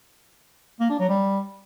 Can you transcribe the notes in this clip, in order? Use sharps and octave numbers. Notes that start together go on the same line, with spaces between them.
A#3
D4
F#3
G3